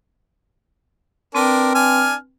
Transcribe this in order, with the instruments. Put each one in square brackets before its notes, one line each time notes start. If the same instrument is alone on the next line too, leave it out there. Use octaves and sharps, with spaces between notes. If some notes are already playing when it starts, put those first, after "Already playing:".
[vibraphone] C4 B4 G5 [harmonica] D4 A#4
[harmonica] D4 G#5 F6